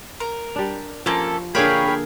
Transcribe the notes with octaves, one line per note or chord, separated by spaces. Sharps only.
A#4
G3 D4
F3 A#3 C#4 A4
D3 A#3 G#4 A#4 C#5 F5 G5 B5